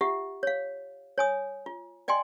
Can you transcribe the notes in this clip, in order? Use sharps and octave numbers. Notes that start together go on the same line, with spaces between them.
F4 G4 E5 F#5
C#5 F5
C#5 G#5 D#6
F4
D5 D#5 G5 G#5 C6